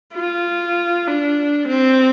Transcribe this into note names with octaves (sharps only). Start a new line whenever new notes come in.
F4
D4
C4